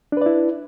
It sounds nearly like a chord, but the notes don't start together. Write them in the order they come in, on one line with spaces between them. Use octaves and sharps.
D4 B4 D5 E4